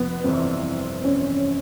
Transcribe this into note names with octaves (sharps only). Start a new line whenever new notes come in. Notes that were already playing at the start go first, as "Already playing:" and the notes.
Already playing: F2 C3 F3 B3
G1 F2 C3 E3 C4
C#4